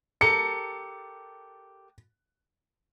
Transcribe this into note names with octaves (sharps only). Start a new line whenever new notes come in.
G4 A4 A#4 C#7